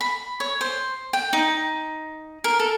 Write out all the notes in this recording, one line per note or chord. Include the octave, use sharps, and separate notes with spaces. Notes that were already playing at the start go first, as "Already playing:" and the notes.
B5
C#5
C5
G5
D#4
A#4
A4